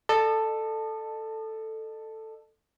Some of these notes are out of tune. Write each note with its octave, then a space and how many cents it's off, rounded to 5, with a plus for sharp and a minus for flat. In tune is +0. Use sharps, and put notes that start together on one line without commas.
A4 +5 D#5 -40